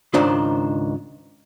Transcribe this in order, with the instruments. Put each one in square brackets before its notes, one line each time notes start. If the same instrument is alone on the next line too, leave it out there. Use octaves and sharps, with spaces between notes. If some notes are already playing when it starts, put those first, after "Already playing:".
[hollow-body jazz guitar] C#2 G#2 D#3 D4 C5